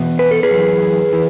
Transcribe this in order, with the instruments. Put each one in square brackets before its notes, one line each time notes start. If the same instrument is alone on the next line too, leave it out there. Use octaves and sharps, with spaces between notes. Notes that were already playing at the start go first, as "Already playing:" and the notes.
Already playing: [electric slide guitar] E2 B2
B4
A4
G#4 B4
F#2 E3
E3